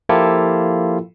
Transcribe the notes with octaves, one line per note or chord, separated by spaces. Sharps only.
F3 A#3 E4 F4 G4 A4